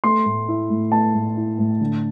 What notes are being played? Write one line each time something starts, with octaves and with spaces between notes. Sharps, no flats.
A3 C6
A2
E4
A2
A3 A5
A2
E4
A2
D3